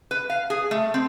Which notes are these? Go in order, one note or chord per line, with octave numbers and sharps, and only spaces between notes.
B4
F5
G#4
A3
C4